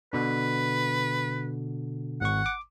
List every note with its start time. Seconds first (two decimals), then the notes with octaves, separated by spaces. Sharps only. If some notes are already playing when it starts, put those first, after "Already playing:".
0.13 B2 D3 B4
2.21 G#1 F#5 C#6
2.46 D6